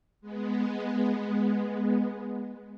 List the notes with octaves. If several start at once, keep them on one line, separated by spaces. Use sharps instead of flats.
G#3 B3